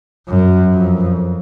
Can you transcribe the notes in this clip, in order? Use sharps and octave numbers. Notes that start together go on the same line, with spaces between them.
F#2
F2